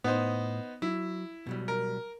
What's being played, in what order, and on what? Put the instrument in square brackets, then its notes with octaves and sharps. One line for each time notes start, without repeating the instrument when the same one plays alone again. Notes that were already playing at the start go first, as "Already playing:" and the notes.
[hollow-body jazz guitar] A2 [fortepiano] B3 D#4 C5
[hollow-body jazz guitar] F#3 [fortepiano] E4
[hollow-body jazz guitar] B2 F#3 G3
[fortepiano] A#4